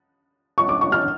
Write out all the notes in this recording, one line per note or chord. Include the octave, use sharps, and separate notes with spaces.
C#6
D6
C#6
F6